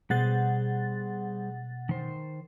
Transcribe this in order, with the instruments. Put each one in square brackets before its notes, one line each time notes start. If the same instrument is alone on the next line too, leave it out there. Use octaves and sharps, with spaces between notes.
[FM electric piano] B2 F#5 A6 [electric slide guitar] G3 G#4 C5
[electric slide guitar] D#3 C5